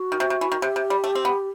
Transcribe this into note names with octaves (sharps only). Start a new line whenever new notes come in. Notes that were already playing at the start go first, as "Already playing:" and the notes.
Already playing: F#4
D#3
C3
C3
E3
D#3
C3 G4
C3
G3
A3
C4
B3